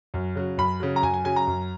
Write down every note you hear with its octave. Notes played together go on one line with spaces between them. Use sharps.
F#2
C#3 F#3
F#2 B5
C#3 F#3
A#5
F#2 G#5
G#5
C#3 F#3 G#5
A#5
F#2